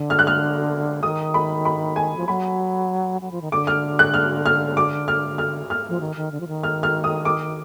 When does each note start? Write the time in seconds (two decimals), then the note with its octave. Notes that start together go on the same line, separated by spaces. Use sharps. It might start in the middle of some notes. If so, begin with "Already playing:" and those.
Already playing: D3
0.10 F6
0.19 F#6
0.27 F6
1.03 D#3 D#6
1.34 B5
1.65 B5
1.96 G#5
2.17 F3
2.28 F#3 B5
3.21 F#3
3.32 F3
3.42 D#3
3.52 D3 D6
3.67 F6
3.99 F#6
4.14 F6
4.46 F6
4.77 D6
5.08 F6
5.38 F6
5.70 F6
5.89 F3
6.00 D#3
6.16 D#3
6.32 D3
6.40 F3
6.48 D#3
6.63 F6
6.83 F6
7.04 D#6
7.25 D6